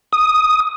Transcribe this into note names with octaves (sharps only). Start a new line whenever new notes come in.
D#6